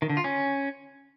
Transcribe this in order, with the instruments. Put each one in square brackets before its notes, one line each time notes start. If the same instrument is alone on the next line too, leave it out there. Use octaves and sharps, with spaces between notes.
[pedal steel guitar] D#3
D3
F4
C#4